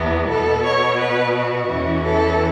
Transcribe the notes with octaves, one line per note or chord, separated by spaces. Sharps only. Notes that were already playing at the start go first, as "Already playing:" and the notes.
Already playing: E2 E3 B3
B2 B3 A4
C#5
B4
F#4
E2 E3 C#4
A4